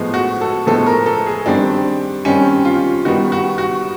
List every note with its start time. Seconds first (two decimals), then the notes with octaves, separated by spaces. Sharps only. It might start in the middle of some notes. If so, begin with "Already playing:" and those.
Already playing: A2 F3 G#3 B3
0.14 F#4
0.41 A4
0.67 A2 F3 G#3 B3 A4
0.87 A#4
1.06 A4
1.26 G#4
1.46 D#3 G3 C4 D4
2.25 D#3 G3 C4 C#4
2.65 F4
3.05 D#3 G3 B3 F#4
3.32 F#4
3.58 F#4